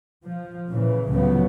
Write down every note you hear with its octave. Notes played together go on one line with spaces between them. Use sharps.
F3
A#2 C#3 E3
C#2 A2 C#3 F3 F#3 B3